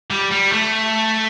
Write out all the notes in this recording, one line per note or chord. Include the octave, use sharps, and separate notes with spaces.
G3
G3
A3